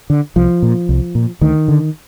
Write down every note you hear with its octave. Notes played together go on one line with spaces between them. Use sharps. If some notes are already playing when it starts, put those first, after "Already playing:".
D3
C2 F3
A#2
C2
A#2
D2 D#3
D3